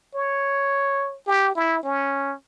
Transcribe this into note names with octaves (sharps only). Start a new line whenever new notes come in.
C#5
G4
E4
C#4